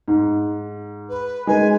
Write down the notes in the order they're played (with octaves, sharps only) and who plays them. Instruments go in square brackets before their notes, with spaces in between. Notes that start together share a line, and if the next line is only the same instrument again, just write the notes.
[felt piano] G#2
[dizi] B4
[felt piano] G#3 D#4 B4 [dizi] G#5